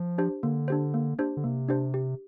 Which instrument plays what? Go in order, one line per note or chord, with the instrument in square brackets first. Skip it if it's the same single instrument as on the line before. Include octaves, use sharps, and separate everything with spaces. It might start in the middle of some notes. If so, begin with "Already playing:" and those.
Already playing: [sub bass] F3
[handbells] D4 G4 C5
[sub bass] D3 [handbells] A#3
[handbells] D4 G4 C5
A#3
D4 G4 C5
[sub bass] D3
[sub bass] C3 [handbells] A#3
[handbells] D4 G4 C5
G4